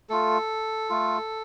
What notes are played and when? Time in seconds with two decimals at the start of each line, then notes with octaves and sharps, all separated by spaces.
0.09 A3 F4 A4
0.89 A3 F4